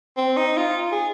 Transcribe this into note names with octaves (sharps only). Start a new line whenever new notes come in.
C4
D#4
F4
G#4